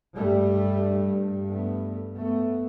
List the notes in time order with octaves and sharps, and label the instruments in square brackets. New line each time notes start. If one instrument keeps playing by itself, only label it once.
[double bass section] G2 G3 A3
A3 B3
A3 B3